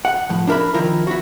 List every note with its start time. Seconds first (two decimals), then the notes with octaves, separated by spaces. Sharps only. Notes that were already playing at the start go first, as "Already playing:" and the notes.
0.05 F#5
0.29 A2 F3
0.47 D4 E4 A#4 E5 B5
0.74 D#3 F3 E4 A#4
1.07 E4 F#4